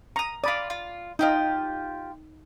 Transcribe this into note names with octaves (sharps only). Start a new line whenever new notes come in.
A#5 C#6 D#6
F4 D5 B5 D#6
F4
D#4 F4 G4 C5 D#5